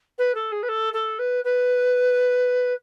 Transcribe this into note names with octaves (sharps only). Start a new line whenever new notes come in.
B4
A4
G#4
B4
A4
A4
B4
B4